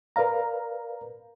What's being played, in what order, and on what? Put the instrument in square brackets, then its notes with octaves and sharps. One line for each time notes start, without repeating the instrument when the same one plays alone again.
[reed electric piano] A#4 B4 D5 F5 A#5